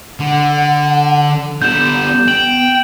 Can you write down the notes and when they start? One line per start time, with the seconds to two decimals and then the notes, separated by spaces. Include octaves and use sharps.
0.20 D3 F#5
1.62 D3 G3 B3 G6 E7
2.28 B3 G5 F#7